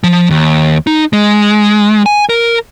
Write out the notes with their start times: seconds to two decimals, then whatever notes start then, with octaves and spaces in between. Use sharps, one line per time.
0.04 F3
0.31 D#2
0.87 D#4
1.13 G#3
2.06 G#5
2.29 A#4